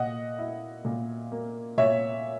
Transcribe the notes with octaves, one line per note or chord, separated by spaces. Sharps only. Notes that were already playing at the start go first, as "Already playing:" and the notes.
Already playing: A#2 D#5 F#5
E4
A#2
A#3
A#2 C#5 E5